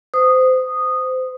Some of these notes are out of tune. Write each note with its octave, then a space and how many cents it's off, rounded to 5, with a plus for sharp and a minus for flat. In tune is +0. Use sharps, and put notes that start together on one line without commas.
C5 -25 D#6 -10